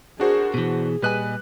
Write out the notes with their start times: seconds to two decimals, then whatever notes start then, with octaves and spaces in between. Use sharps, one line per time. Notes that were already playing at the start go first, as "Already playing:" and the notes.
0.20 D4 F#4 G#4 A#4 C5
0.54 B2 E3 G#4
1.02 A#2 G3 B4 D#5 G#5 F#6